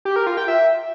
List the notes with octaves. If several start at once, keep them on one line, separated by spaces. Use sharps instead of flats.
G4
A#4
F4
G5
E5